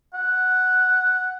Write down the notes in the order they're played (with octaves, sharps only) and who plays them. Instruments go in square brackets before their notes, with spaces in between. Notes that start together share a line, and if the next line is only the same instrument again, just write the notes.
[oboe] F#5